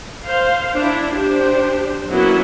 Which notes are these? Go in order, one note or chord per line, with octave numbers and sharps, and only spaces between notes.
C5 F5
D4 E4
D4 G4 C5
F#3 A#3 B3 C#4 E4 F#4